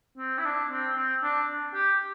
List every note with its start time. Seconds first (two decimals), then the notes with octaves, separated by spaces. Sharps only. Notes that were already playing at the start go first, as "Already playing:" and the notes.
0.18 C4
0.38 E4
0.45 D4
0.71 C4
0.96 C4
1.23 D4
1.74 G4